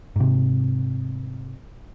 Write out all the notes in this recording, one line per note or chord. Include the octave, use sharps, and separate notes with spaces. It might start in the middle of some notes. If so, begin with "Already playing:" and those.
G#2 C3